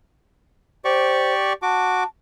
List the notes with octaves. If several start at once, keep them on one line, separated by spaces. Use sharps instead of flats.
G4 C5 D5 C#6
F#4 A5 D6